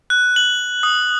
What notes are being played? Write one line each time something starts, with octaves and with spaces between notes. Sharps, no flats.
F#6
F#7
D#6